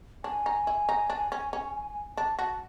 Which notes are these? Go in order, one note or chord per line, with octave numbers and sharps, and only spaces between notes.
D4 G#5
D#4
E4
D#4
D4
C#4
C#4
D4 A5
F#4 A5